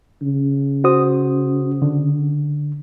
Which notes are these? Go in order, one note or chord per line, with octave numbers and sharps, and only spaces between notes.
C#3
F#4 C5 D#6
D3